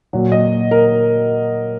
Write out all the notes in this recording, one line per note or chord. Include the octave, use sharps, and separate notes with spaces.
A#2 F#3
D#5
A#4